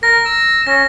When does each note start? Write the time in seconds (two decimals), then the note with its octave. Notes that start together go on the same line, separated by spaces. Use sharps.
0.03 A#4 A#6
0.25 E6
0.67 C#4 A#6